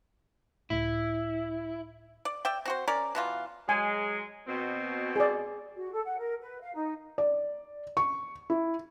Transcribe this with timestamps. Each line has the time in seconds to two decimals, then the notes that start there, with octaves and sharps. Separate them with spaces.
0.70 C#2 A2 E4
2.25 D5
2.45 D5 E5 G5
2.65 C4 F#4 C5
2.88 C#4 A#4 D5
3.15 B2 E3 F4
3.69 F#3 G#3 G#5
4.47 B2 C4
5.16 G#4 D5
5.76 F#4
5.92 A4
6.05 F#5
6.18 A#4
6.41 B4
6.60 F5
6.73 D#4
7.18 D5
7.97 C#6
8.50 E4